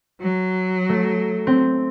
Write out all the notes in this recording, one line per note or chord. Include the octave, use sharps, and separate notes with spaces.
F#3
A3
C4